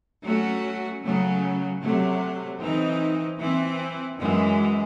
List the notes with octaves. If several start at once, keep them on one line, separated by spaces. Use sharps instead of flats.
F#3 A3 C#4 F#4
C#3 F#3 A3
C3 F#3 A3
E3 C4 D#4
E3 C4 E4
F#2 E3 G#3